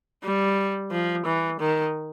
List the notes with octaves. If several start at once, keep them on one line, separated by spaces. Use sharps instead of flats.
G3
F3
E3
D#3